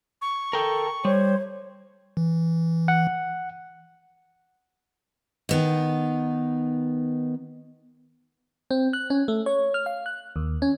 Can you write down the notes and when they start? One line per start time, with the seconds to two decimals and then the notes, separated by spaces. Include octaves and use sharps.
0.21 C#6
0.53 A4 A#4 G5
1.05 G3 C5 C#5
2.17 E3
2.88 F#5
5.49 D#3 B3 D#4
8.71 C4
8.93 F#6
9.10 C#4
9.28 A3
9.46 C#5
9.74 F6
9.86 F5
10.06 F#6
10.36 D#2
10.62 C#4